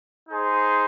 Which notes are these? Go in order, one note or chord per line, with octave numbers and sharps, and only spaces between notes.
D#4 G#4 C5